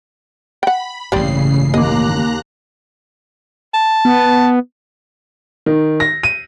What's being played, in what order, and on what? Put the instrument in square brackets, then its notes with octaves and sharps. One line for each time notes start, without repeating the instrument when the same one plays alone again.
[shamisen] F#5 G5 [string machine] B5
[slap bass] A1 G2 A#2 [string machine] C#3 C7 [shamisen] G3 C4 D4
[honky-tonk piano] D#2 D6 [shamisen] D#5 [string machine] A#5 F#6
[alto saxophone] A5
[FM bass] B3
[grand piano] D#3
A#6
D#7